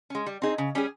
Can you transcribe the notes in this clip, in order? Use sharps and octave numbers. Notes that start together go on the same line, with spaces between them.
G#3 C#4
G3
C4 D#4 G#4
C#3
G3 C#4 G#4